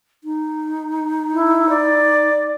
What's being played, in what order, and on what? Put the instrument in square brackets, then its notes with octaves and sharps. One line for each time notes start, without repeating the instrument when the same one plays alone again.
[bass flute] D#4
[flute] E4
D5